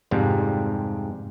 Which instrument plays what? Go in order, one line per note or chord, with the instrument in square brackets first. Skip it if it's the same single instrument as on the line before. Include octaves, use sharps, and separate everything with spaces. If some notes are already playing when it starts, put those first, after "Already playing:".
[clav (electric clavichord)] F2 G#2 C3 G3